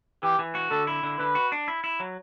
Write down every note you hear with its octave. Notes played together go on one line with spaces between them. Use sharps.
E3 G4
E3
F#4
D3 A4
E4
D3
D3 B4
F#4
D4
E4
E4
F#3